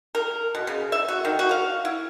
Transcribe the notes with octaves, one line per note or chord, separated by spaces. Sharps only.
A#4
B2
C#3
E5
F#4
D#3
F#4
F5
E4